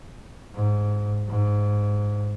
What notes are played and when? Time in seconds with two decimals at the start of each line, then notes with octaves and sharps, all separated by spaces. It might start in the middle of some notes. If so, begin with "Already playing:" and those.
0.55 G#2
1.28 G#2